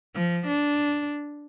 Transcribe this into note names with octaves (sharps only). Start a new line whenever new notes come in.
F3
D4